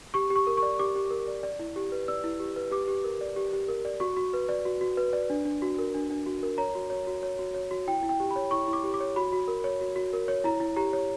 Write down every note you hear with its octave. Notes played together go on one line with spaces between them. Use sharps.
G4 C#6
G4
C#6
A#4
C#6
D5
G4 D6
G4
A#4
D5
D5
E4
G4
B4
D5 E6
E4
G4
B4
G4 D6
G4
A#4
D5
G4
G4
A#4
D5
F#4 C#6
F#4
B4
D5
F#4
F#4
B4
D5
D4
D4
F#4
A#4
D4
D4
F#4
A#4
C#5 A#5
F#4
C#5
F#4
C#5
F#4
C#5
F#4
E4 G5
E4
G5
G4
B5
C#5
E4 C#6
E4
D6
G4
D6
C#5
F#4 B5
F#4
A#4
C#5
F#4
F#4
A#4
C#5
E4 A#5
E4
G4 A#5
C#5